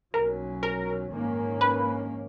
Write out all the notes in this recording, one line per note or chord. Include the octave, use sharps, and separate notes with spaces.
B1 A#2 F#3 C#4 A#4
A#4
A#1 G#2 D#3 A#3 C#4
B4